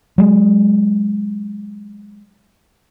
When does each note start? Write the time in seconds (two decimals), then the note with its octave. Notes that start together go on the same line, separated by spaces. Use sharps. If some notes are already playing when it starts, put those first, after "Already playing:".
0.18 F#3 G#3